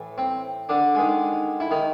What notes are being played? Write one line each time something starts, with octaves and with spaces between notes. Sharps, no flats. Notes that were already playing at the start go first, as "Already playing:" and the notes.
Already playing: A2 E3 A3
C4
D3 D4
D#3 G#3
E4
D#3 D#4